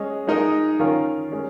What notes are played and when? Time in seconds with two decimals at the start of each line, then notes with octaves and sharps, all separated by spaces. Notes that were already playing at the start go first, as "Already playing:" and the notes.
Already playing: G#3 C#4 G#4 D#5
0.27 G#3 D#4 A#4 D#5
0.79 D#3 C#4 F4 A#4
1.31 G#3 C#4 A#4